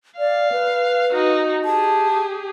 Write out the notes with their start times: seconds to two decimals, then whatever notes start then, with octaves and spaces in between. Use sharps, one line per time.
0.19 D5 F5
0.52 B4
1.12 D#4 F#4
1.65 G4 G#4 A5